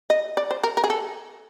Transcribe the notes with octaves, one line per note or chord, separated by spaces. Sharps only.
D#5
D5
C5
A#4
A#4
G#4
A4